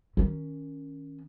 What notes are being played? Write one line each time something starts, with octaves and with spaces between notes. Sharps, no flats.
D#3 C#4